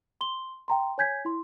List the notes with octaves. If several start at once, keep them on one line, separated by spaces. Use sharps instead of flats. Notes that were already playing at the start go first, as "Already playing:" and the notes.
C6 G7
G5 A#5 C6
C#5 G#5 G6 G#6 B6
E4 C6